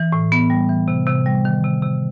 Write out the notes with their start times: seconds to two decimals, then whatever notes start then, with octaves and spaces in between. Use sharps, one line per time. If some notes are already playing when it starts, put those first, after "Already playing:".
Already playing: E3
0.12 A2
0.32 B3
0.50 G3
0.69 E3
0.88 C3
1.07 C3
1.26 G3
1.45 D#3
1.64 C3
1.82 C3